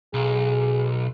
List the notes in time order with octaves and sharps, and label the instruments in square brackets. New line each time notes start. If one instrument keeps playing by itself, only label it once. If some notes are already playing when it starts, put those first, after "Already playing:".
[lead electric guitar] B1 [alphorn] G#4